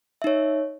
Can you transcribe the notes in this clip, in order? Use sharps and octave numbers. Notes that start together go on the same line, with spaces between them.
D#4 C#5 E5